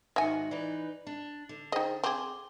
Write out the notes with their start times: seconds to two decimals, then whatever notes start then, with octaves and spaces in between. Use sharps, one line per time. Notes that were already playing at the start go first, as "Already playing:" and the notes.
0.16 G#2 D#3 F#4 E5 G#5 A#6 C#7
0.51 E3 D#4 B4 D5
1.07 D4
1.49 D3
1.72 D#4 G#4 C5 D#5 G5
2.04 C4 G#4 D6 G7